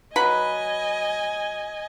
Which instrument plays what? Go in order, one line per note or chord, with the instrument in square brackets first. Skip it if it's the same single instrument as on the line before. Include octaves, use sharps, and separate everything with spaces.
[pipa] F#3 B4 B5 [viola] D#5 G#5